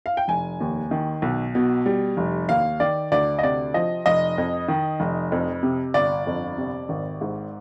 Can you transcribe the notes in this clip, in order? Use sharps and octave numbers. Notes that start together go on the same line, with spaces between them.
F5
G5
F1 G#5
D#2
D#3
B1
B2
G3
F1
D#2 F5
D#3 D5
D2 D5
D#5
C3 D5
F3 D#5
F1 D#5
F2
D#3
F1
F2
C3
G1 D5
F2
C3
G#1
G#2